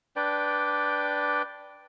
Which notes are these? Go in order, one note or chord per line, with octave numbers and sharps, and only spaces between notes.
D4 B4 D5 G5